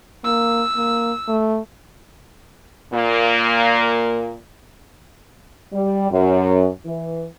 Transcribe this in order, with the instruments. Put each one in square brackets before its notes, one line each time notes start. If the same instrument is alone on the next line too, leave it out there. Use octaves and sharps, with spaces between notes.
[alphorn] A#3 [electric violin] E6
[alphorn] A#3
A3
[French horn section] A#2 A#3
G3
F#2
E3